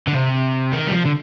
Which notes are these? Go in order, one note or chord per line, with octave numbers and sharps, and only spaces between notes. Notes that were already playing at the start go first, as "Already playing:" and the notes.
D3
C3
D#3
G3
F3
D3